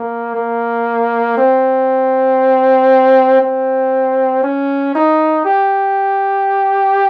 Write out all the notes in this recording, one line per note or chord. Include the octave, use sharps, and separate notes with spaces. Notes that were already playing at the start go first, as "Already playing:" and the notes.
Already playing: A#3
A#3
C4
C4
C#4
D#4
G4